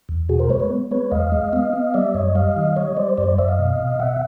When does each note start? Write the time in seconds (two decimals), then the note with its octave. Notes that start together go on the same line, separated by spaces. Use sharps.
0.09 E2
0.29 B2 F#4 G#4
0.39 A#4 C5
0.49 G#3 B4 C#5
0.60 B4 C#5
0.70 B3
0.91 G#3 B4 C#5
1.11 E2 D#5 F5
1.32 G#3
1.53 B3 D#5 F5
1.73 B3
1.94 G3 D5 E5
2.14 F#2 C#5 D#5
2.35 G3 D#5 F5
2.57 D#3
2.76 G3 C#5 D#5
2.97 G3 C5 D5
3.18 F#2 C5 D5
3.28 C5 D5
3.38 F#2 D5 E5
3.49 D#5 F5
3.59 B2
3.79 B2
3.99 B2 E5 F#5